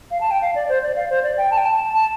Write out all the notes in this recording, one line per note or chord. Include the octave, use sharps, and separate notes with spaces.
F5
A5
G5
F5
D5
C5
D5
F5
C5
D5
G5
A5
G5
A5
A5